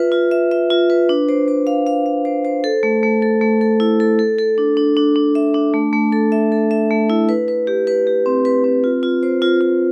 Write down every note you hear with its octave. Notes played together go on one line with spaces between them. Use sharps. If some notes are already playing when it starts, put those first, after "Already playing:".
Already playing: F4 B4 E5
F4
E5
E5
F4
B4
D4
C5
C5
F5
F5
F5
C5
C5
A4
A3
A3
A4
A3
A4
E4
A4
A4
A4
D4
D4
D4
D4
E5
D4
A3
A3
A4
E5
A4
E5
A3
E4
B4
B4
G4
B4
G4
C4
B4
C4
F4
F4
C5
F4
F4